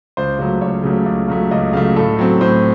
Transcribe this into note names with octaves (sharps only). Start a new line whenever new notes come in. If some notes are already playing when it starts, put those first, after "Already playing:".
C#2 C5
C#3 F#3 A3 C5
C#2 C#5
C#3 F#3 A3
C#2
C#3 F#3 A3
C#2 D#5
C#3 F#3 A3 F5
A2 A4
F#3 C4
A2 C5